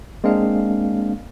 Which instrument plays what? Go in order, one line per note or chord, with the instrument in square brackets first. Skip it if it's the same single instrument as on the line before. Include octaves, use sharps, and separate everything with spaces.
[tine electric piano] G#3 A#3 C4 D4 F5